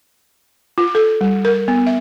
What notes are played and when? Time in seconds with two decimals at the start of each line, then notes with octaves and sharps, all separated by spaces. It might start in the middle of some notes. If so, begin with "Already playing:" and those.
0.78 F4
0.95 A4
1.21 G3
1.45 A#4
1.68 B3
1.86 E5